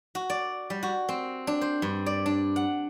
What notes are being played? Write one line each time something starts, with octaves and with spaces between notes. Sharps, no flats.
F#4
D5
G3
F#4
C4
D4
C5
G2
D5
D4
F#5